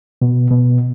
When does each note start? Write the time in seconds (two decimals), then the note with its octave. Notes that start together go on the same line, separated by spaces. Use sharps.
0.22 B2
0.51 B2